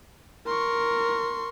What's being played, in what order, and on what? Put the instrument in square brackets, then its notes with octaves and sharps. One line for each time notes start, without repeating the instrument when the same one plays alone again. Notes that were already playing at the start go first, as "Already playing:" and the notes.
[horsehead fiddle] A#4 [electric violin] C6 C#6